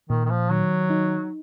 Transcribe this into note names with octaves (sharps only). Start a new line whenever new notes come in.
A#2 D#3
D#3
F3
D#3 F#3
D#4